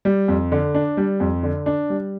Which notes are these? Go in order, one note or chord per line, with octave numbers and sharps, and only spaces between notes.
G3
F2
D3
D4
G3
F2
D3
D4
G3